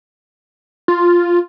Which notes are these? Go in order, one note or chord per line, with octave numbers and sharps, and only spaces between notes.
F4